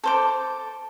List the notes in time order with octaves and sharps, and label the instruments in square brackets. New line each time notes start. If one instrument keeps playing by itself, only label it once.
[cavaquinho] A4 C5 D6